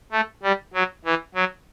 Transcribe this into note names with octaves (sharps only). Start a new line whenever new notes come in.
A3
G3
F#3
E3
F#3